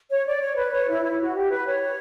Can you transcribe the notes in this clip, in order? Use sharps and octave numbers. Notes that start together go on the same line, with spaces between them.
C#5
D5
C#5
B4
C#5
E4
E4
F#4
G4
B4
C#5